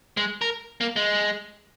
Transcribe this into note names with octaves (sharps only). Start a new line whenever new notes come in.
G#3
A#4
A#3
G#3